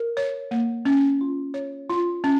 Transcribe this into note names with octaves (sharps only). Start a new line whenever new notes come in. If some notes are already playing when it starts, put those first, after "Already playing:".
Already playing: A#4
C#5
A#3
C#4
F4
C#5
F4
C#4